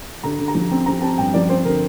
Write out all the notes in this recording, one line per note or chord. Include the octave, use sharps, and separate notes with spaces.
D3 A#5
D3
A#5
F3
C4
C4 A#5
C4 A5
G2 G5
F3 D5
C4 C5
D3 A#4